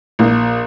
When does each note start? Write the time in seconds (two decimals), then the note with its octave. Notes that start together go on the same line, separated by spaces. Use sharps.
0.19 A#1